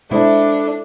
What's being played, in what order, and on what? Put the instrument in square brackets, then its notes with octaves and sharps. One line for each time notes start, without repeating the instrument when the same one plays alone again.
[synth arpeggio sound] B2 G#3 C5 [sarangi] D4 [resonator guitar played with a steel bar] E4 [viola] A4